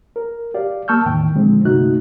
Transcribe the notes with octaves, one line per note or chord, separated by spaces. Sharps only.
A#4
G4 D5 F5
A#3 A5 C#6 E6 F6 G6
E2 A2 D#3 G5
A#2 D3 F3 G#3 C4
G2 C3 A3 D#4 F#4 F#6